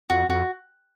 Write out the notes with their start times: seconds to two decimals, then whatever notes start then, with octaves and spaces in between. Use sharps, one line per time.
0.10 F2 F#4
0.29 F2 F#4